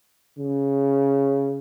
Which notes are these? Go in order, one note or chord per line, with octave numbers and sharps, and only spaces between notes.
C#3